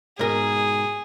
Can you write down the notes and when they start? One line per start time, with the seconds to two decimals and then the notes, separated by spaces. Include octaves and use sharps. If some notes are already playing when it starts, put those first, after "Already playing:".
0.19 G#2 B2 G#4 A#4